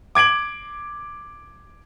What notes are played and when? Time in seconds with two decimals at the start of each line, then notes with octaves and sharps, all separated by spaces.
0.15 D6 G#6 D7 F#7